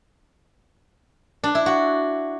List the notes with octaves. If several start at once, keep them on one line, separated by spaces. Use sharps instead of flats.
D4
E4
F#4